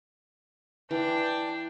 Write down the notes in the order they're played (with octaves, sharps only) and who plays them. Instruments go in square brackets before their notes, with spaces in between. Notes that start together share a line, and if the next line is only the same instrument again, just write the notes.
[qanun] E3 [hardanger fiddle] D4 G5